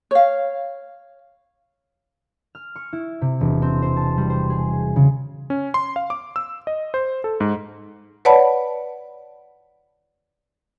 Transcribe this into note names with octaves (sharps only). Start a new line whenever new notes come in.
C#5 F5
F6
C#6
E4
C3
E1
C4
C5
A5
G3
C5
G#4
C#3
C#4
C6
F5
D6
E6
D#5
C5
A4
G#2
B4 C#5 D5 F#5 A5 B5